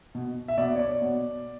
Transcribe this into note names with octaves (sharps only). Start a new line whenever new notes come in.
B2
E5
B2 D5
C#5
D5
B2